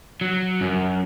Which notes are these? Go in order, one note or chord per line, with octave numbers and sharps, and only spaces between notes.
F#3
F#2